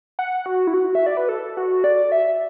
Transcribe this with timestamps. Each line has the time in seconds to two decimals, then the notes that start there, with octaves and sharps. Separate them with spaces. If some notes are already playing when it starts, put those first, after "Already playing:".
0.19 F#5
0.46 F#4
0.67 E4
0.74 F#4
0.95 E5
1.06 D5
1.17 B4
1.29 A4
1.57 F#4
1.84 D5
2.12 E5